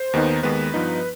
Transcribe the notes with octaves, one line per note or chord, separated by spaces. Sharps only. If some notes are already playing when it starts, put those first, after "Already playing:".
Already playing: C5
D#2 D#3 B3 D#4
D#2 D#3 G#3 B3 B4
G2 F3 B3 D#4